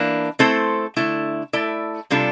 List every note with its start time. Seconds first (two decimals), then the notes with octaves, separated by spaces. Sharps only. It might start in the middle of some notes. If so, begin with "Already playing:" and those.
Already playing: E3 A#3 D4
0.39 A3 C4 E4 A4 C5
0.96 D3 A3 E4
1.53 A3 E4 A4 D5
2.10 C3 G3 D4 F4 A4